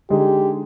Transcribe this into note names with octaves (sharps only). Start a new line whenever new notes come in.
D3 G#3 D#4 G4 G#4